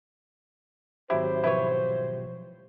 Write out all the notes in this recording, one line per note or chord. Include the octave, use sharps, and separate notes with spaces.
G#1 F#3 E4 G4 C5
B2 F3 E4 B4 C#5